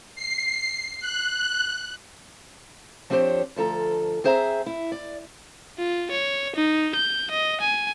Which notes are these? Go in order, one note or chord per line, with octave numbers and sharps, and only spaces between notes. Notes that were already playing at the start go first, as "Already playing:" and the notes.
C7
F#6
F3 C4 D4 G4 C5 C#5
D2 F3 A4 A#5
C4 G#4 C5 E5 G5 A#5
E4
D5
F4
C#5
D#4
G6
D#5
G#5